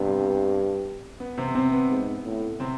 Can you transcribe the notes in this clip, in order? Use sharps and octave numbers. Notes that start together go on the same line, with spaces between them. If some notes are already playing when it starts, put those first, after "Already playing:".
Already playing: G2 C3 B3 C4
B3
C3 C4
C3 C4
B3
G#2
A2
C3 C4